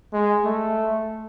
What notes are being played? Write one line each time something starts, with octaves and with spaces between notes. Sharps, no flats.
G#3
A3